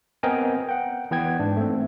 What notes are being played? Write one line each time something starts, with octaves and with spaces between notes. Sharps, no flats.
B3 C4 A#4 D#5 G5 G#5
F#5 G5
E3 B3 G5 G#6
G#2 D4
A3 C4